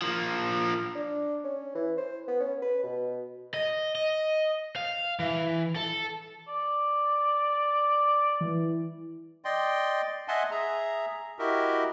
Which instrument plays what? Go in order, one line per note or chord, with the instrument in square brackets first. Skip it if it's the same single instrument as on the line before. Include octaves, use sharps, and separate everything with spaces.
[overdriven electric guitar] F3 A#3
[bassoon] D4
C#4
E3
C5
B3
C#4
B4
B2
[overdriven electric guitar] D#5
D#5
F5
E3
A4
[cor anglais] D5
[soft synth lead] E3
[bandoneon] D5 D#5 G5 C6
D#5 E5 F#5 G#5 A5 C6
G#4 E5 A#5
E4 F#4 G4 A#4 D#5 E5